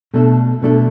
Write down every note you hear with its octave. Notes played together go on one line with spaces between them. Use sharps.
B2 A3 D4 A4
B2 A3 D4 A4